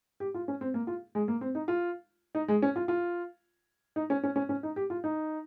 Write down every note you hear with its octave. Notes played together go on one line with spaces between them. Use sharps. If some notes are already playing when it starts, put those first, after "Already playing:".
G4
F4
C#4
C4
A#3
F4
G#3
A#3
C4
D#4
F4
D#4
G#3
C#4
F4
F4
D#4
C#4
C#4
C#4
C#4
D#4
G4
F4
D#4